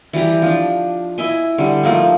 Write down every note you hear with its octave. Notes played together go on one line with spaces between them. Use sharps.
E3 G3 G4 A#5
F3 D4
E4 D#5 E5 G#5
D3 G3
F3 A3 A#3 D#4